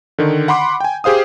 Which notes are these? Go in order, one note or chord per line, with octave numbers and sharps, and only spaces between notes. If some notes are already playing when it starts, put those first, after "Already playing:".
D3 D#3
F#5 B5 C6 D6
G5 G#5
G4 G#4 C5 F5 D#6